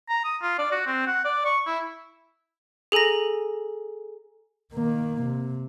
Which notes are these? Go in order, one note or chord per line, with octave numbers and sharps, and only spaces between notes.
A#5
D#6
F4
D5
F#4
C4
F#5
D5
C#6
E4
G#4 A4 G#5 A#5 A#6
D#3 A#3
C3